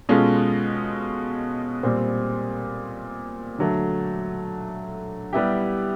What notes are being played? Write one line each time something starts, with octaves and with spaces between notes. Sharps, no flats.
B2 G#3 C#4 F4 A4
A#2 G3 C4
D3 F#3 A3
G3 B3 E4 G4